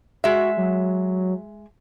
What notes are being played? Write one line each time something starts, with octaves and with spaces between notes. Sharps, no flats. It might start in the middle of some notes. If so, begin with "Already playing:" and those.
G#3 F#4 E5
F#3